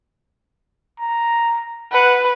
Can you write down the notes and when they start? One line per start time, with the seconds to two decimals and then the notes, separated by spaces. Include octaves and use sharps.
1.00 A#5
1.92 B4 F#5